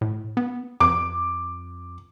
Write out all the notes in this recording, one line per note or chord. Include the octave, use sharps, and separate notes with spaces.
A2
B3
F2 D6